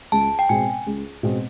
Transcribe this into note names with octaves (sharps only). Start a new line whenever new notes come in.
C#2 A5
G5
B2 G#3 C4 G#5
C#2
B2 G#3 C4